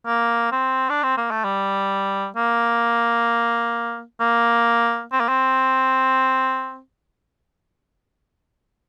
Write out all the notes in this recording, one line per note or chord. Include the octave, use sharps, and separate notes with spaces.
A#3
C4
D4
C4
A#3
A3
G3
A#3
A#3
C4
A#3
C4